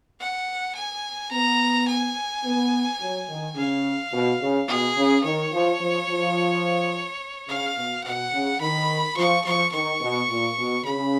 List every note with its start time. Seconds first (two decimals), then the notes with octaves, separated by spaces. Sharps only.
0.20 F#5
0.75 G#5
1.32 B3 A#5
1.88 G#5
2.44 B3
3.00 F#3
3.28 D#3
3.56 C#3 F5
4.12 B2
4.40 C#3
4.68 B2 G#4
4.96 C#3
5.24 D#3 C#5
5.52 F3
5.80 F3
6.08 F3
7.48 C#3 F5
7.76 B2
8.04 B2 F#5
8.32 C#3
8.61 D#3 B5
9.17 F3 C#6
9.45 F3 C#6
9.72 D#3 C#6
10.00 B2
10.29 A#2
10.57 B2
10.85 C#3 B5